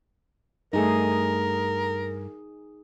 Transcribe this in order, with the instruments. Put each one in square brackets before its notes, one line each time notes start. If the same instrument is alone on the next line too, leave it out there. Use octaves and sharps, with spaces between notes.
[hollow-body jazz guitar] G2 A3 [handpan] D#4 G#4 [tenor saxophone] A#4